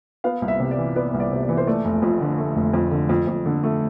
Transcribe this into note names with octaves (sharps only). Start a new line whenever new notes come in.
B3 F5
C2
E5
C3
D5
E3
B3 D5
C2
D5
C3
D5
E3
C5
A3 D5
F1
F2
D3
A3
F1
F2
D3
F2
F2
D3
A3